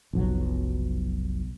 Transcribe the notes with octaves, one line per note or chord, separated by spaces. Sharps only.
F1 B1 F#3